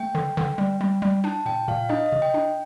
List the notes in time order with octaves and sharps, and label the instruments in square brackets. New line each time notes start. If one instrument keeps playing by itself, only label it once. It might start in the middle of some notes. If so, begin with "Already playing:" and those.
Already playing: [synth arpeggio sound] A3 [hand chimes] G5
[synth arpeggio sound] D3
D3
G3
G3
G3
[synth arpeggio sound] D4 [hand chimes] A5
[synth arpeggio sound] A#2 [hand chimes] G5
[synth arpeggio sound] A#2 [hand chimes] F5
[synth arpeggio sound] D4 [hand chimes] D#5
[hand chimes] D#5
[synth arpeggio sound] C3
[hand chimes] G5
[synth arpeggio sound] D4